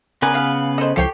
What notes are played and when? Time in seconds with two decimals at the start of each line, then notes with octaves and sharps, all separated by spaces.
0.22 C#3 B3 A#4 B4 D5 G#5
0.34 G#4 F5
0.78 A4 C5 D#5
0.96 C#2 F3 G4 A4 C#5 G5 C7